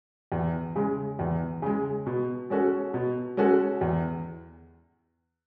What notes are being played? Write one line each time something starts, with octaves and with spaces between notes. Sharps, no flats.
E2
C#3 G#3
E2
C#3 G#3
B2
G#3 C#4 F#4 A4
B2
G#3 C#4 F#4 A4
E2